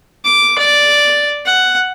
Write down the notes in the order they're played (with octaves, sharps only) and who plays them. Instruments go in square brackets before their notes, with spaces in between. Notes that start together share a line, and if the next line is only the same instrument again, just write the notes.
[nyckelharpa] D6
D5
F#5